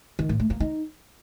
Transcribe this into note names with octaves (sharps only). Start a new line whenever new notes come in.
D#3
A2
A3
A#3
D#4